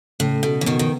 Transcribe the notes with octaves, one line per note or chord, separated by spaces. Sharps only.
A2 C#3
B2 A4
E3
B2 D#3 B3
D#3